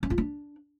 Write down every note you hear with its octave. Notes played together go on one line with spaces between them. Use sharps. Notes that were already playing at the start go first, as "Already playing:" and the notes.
C#4
F4
D4